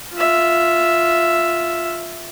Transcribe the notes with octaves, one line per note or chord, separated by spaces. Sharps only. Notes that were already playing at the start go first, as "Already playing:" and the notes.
F4 E5